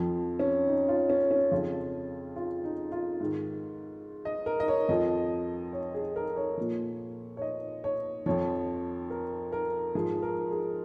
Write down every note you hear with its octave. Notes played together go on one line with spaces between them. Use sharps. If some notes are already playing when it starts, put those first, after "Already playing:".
Already playing: F2 F3
C#4
D#4
F4
C#4
C#4
F2 C#3 F3 F4
F4
D#4
F4
G#2 D#3
D#5
A#4
D#5
C#5
F2 F3 D#5
C#5
G#4
A#4
C#5
A#2 F3
C#5
D#5
C#5
F2 F3 C#5
A#4
A#4
G#2 F3 G#4
A#4
G#4